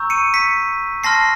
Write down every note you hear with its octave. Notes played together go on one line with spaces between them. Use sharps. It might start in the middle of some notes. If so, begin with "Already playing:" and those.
Already playing: A#5 C#6 E6 G6
C#7 D#7
B6 C#7
A5 C6 F6 A#6 C7